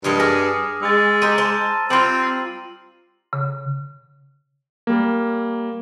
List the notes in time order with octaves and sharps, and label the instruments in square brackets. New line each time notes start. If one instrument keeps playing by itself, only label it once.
[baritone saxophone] G2 [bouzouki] F3 G#3 A#4
[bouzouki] G#4 [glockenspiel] D6 F6 A#6
[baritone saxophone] G#3 [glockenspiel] E6 A6
[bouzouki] D#4 G4 [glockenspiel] A#5 C6 D#7
[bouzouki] C5 A5
[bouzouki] G3 F4 [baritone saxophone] C4 [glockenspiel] F#7
[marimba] C#3
[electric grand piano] G3 A#3